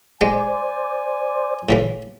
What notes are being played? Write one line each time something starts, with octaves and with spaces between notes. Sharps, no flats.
G#3 C5 D5 G5 G#5
A2 C#3 E3